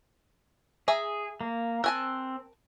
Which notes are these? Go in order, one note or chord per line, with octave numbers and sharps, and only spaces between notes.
G#4 E5 G#5 A#5
A#3
C4 A#4 G#5 A5 E6 F#6